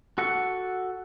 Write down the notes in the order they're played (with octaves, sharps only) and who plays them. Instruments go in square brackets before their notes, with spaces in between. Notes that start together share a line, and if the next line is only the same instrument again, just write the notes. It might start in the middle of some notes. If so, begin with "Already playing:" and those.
[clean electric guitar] F#4 A4 F#5